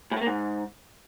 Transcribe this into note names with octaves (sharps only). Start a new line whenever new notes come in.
A2
A3
A#3
G#2